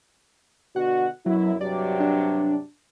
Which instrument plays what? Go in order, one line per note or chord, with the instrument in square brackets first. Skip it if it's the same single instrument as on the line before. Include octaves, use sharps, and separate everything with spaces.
[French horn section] B2 D3 F#4 [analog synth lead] F#5
[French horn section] F#2 B2 E4 [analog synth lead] F#3
[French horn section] G2 C3 F#3 [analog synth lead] D5
[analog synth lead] D4